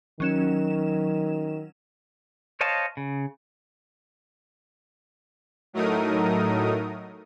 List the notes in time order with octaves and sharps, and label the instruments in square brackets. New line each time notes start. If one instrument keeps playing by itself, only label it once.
[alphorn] D#3 [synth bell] F#3 C#4 E7
[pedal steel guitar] C5 C#5 D#5 F5 A5
C#3
[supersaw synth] A2 F#3 A3 D#4 A#4 D#6